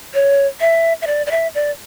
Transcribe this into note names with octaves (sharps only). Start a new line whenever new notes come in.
C#5
E5
E5
D5
D5
E5
D5